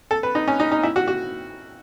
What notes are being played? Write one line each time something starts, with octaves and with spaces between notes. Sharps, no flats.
A4
B4
D#4
C#4
D#4
D#4
E4
F#4
F#4